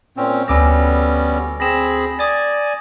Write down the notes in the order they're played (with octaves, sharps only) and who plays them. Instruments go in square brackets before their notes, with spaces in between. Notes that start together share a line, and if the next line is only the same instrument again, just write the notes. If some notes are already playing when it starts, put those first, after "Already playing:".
[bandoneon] A#2 C4 C#4
[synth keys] D2 D6 E6 [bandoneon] G3 B3 C#4 [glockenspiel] G#5 A#6
[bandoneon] C4 G#4 B5 [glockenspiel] A#6 E7
[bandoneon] D5 G#5 [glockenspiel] D#6 A6